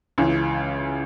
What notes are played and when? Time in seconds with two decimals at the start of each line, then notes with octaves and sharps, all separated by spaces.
0.18 C#2 C#3 E3